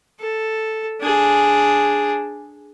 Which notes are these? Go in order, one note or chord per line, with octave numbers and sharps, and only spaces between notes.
A4
D4 G#4